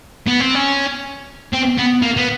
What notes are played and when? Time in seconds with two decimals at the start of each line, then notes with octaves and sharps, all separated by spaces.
0.28 B3
0.41 C4
0.55 C#4
1.53 C4
1.78 B3
2.02 A#3
2.17 B3